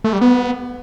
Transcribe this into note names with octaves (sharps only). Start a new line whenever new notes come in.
A3
G3
B3